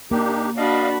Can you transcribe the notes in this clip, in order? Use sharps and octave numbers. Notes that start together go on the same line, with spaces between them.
A#3 D4 D#4 G4
D4 F#4 D#5 F5 B5